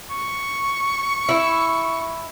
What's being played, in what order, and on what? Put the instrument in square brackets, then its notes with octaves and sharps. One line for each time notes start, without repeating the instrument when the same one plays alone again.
[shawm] C#6
[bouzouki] E4